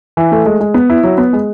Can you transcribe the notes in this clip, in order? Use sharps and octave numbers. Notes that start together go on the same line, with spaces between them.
E3
A3
G#3
G#3
B3
E4
F#3
B3
G#3